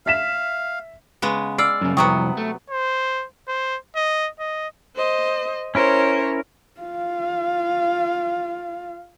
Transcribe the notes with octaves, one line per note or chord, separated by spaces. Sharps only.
E5 F5 B6 E7
C#3 G#3 B3
D5 E6 F6 C7
F#2 C#3
C2 F2 C3 F#3 B3 G5 C#6 D#6
A3
C5
C5
D#5
D#5
C5 D#5
C#4 E4 A#4 C5 C#5
F4 F5